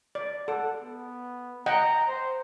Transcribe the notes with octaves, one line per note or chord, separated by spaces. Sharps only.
D5
A4 F#5
B3
D#5 F#5 G5 A#5
C5